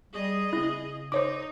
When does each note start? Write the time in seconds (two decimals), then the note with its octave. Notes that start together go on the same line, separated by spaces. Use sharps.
0.13 G3 G#4 D#5
0.53 C#3 C4 E4
1.12 D#4 C5 C#5 D6